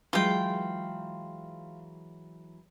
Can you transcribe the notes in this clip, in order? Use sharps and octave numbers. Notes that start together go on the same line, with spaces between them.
E3 F#3 G#3 F4 G5